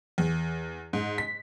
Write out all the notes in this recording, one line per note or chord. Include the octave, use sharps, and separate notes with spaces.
E2
G#2
B6